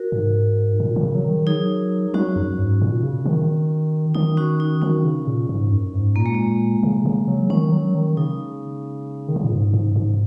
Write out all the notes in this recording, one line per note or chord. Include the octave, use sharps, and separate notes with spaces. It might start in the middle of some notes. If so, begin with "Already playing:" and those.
Already playing: F#4 A#4
G#2
A#2
D#3
C#3
F#3
D#3
F#3 D#4 G#4
F#3 C#4 F#4
F#2
G#2
A#2
C#3
D#3
D#3 D#4
C#4 F#4
D#4
D#3 C#4
C#3
A#2
G#2
F#2
G#2
A#2 A#3
G#3
A#3
C#3
C#3
F#3
D#3 C#4
F#3
D#3
C#3 D#4
D#3
C#3
A#2
G#2
G#2
G#2